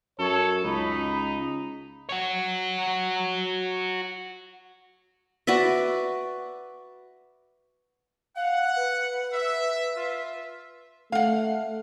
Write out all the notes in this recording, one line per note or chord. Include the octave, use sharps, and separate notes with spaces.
F#2 A4 C#5
C#2 D#4 B5
F#4 C#5
F#4 B4 D5 E5
F5 F#5
B4
E5
F4 E5
A3 F5 F#5